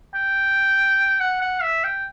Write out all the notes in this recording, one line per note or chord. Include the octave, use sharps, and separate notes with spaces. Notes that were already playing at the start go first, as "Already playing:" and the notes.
G5
F#5
F#5
E5
G5